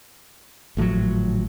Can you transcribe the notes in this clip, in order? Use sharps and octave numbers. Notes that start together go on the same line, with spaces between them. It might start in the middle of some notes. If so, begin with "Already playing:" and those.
G#1 A2 F3 F#3